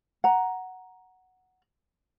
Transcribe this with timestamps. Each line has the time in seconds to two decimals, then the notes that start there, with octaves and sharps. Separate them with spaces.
0.24 F#5 A#5